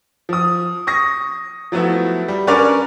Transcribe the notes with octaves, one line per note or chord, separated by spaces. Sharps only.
F3 D#6
C#6 D#6 A#6
F3 F#3 A3 B3 E4
G3
C#4 D4 A#4 B4 C#5 D5